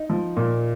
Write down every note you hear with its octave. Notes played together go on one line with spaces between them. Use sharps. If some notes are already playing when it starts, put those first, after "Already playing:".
Already playing: D#4
F3
A#2